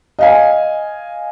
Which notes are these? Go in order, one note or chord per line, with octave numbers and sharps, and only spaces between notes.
D#5 F5 G#5